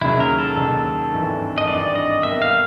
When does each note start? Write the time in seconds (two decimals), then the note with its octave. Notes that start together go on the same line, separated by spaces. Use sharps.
0.01 D#2 C#3 F#3 E4
0.20 A#4
0.39 A4
0.57 D#2 C#3 F#3
1.12 G#1 G2 E3
1.58 D#5
1.67 G#1 G2 E3 D5
1.95 D#5
2.23 B1 B2 G3 A#3 E5
2.42 F5